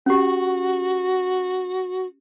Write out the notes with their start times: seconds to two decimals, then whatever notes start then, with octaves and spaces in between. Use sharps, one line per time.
0.06 C#4 F#4 G4